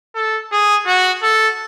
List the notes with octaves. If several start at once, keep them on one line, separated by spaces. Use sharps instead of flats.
A4
G#4
F#4
A4